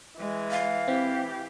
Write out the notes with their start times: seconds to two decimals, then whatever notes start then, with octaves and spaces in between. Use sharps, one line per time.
0.19 E3 G#3
0.51 F5
0.88 C4 E4 G4